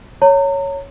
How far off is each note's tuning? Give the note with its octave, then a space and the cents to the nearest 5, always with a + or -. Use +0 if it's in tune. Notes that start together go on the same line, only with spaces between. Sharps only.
C#5 +5 A#5 -35